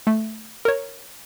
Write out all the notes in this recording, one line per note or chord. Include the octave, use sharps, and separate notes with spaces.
A3
A#4 C#5